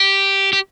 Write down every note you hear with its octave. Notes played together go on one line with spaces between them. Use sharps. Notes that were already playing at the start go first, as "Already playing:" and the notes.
Already playing: G4
G4